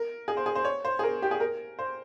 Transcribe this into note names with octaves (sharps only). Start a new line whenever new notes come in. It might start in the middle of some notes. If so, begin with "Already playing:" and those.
Already playing: A#4
G#4
C5
G#4
C5
C#5
C5
G#4
A#4
G4
G#4
A#4
C5